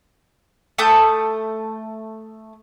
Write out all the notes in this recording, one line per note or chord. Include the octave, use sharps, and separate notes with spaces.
A3 A5 D#6 G6